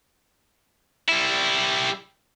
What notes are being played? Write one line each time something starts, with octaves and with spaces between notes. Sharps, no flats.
G3 E4